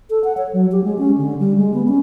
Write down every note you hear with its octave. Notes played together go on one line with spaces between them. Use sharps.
A4
F#5
C#5
F#3
G4
G#3
C#4
D3
G3
G#3
B3
C#4